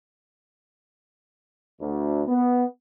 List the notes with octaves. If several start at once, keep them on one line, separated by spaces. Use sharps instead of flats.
D2
B3